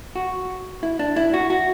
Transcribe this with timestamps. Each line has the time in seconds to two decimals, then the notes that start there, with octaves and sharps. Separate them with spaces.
0.16 F#4
0.83 E4
0.99 D4
1.16 E4
1.34 F#4
1.50 F#4